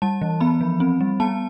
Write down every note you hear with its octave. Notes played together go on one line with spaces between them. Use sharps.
G3 A5
E3
B3 B5
F3
C4
G3
B3 A5